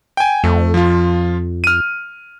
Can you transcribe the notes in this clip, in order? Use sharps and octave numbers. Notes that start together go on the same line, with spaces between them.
G5 G#5
F2 A3
F3 F4
F6 D#7